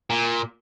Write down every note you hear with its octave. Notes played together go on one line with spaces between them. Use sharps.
A#2